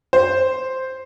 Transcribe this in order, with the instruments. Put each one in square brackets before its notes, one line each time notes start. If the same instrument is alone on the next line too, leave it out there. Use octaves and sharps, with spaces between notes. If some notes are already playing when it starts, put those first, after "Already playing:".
[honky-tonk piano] C5